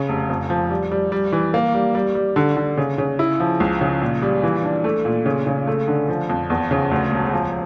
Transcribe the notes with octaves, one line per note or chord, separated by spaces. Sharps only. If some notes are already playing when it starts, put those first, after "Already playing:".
Already playing: C#3
F1
F2
F3
G3
G3
G3
E3
A#3
G3
G3
G3
D3
D3
C#3
C#3
E4
F3
C#2
C#3
A#2
G3
E3
D4
A3
A#2
C#3
C#3
A3
D3
F3
F2
E2
C#3
D2
E1
F3